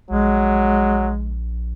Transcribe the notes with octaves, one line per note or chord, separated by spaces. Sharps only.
A#1 F#3 G#3